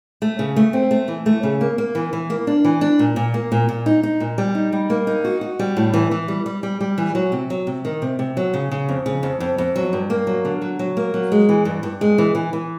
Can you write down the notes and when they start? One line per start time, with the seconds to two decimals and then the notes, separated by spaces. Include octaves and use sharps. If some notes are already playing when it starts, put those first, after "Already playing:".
0.22 A3
0.39 C#3
0.56 A3
0.73 C4
0.91 A3
1.08 E3
1.26 A3
1.43 C#3
1.61 A#3
1.78 A#3
1.95 E3
2.13 E3
2.30 A#3
2.47 D4
2.65 E3
2.81 D4
2.99 A#2
3.16 A#2
3.34 A#3
3.52 A#2
3.69 A#2
3.86 D#4
4.03 D#4
4.20 A#2
4.38 G3
4.55 D#4
4.73 G3
4.90 A#3
5.07 D#4
5.25 F#4
5.41 F#4
5.59 G3
5.77 A2
5.93 E3
6.11 E3
6.28 G3
6.46 G3
6.63 G3
6.81 G3
6.98 E3
7.15 F#3
7.32 C3
7.50 F#3
7.67 C3
7.85 D#3
8.02 C3
8.19 C3
8.37 F#3
8.54 C#3
8.71 C#3
8.89 F2
9.06 C#3
9.23 F2
9.40 F2
9.58 F2
9.76 F#3
9.93 G2
10.10 A#3
10.27 F#3
10.45 D3
10.62 F#3
10.79 F#3
10.97 A#3
11.14 F#3
11.32 G#3
11.49 E3
11.65 G2
11.83 G2
12.01 G#3
12.18 E3
12.35 E3
12.53 E3